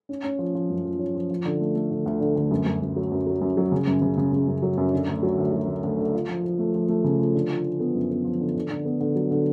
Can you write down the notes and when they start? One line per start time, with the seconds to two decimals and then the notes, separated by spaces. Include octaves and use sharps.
0.09 C#4
0.24 C#4
0.39 F3
0.55 F3
0.70 F#2
0.85 F3
0.99 C#4
1.15 F3
1.30 F3
1.45 D3
1.60 A3
1.75 A3
1.90 D3
2.06 D2
2.20 D3
2.36 D2
2.51 F#2
2.66 F#2
2.81 F#2
2.96 F#3
3.11 F#2
3.26 F#3
3.41 F#2
3.57 F#3
3.72 C#3
3.87 F#2
4.02 C#3
4.17 C#3
4.32 C#3
4.47 F#2
4.62 F#3
4.77 F#2
4.93 D3
5.08 D2
5.23 F#3
5.38 D2
5.53 F#3
5.68 D2
5.83 D2
5.98 D3
6.14 F4
6.28 F3
6.44 F3
6.59 A3
6.74 F3
6.89 A3
7.04 C#3
7.19 F3
7.35 D3
7.50 F3
7.64 F3
7.80 B3
7.95 F#2
8.10 B3
8.25 F3
8.40 D3
8.56 D3
8.70 D3
8.85 B3
9.00 D3
9.16 F#3
9.31 D3